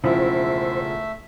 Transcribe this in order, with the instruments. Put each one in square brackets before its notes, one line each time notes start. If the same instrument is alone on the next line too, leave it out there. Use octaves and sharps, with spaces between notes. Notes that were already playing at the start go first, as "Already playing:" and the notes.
[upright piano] E1 F3 E4 [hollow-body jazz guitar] C#3 [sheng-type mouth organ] A3 E5 [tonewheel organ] C5